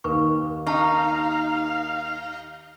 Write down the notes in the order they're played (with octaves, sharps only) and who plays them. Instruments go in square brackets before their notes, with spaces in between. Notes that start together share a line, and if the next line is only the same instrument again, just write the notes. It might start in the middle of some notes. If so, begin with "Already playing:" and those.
[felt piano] D#2 [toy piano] A#4 B4 C#6
[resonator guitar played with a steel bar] D#4 [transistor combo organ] F5 [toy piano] A5 C#6